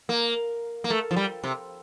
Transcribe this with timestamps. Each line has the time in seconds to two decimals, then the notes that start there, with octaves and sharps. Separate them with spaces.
0.09 A#3
0.84 A#3
0.90 A3
1.11 F3
1.16 G3
1.44 C3